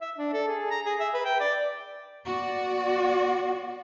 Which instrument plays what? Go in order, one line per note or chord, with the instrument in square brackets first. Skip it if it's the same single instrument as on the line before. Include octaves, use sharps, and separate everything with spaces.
[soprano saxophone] E5
D4
A4
G#4
A#5
G#4
E5
B4
G5
D5
[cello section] B3 F#4 D5